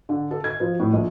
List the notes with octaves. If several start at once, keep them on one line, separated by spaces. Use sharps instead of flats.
D3
A4
G#6
F3
A2
A#1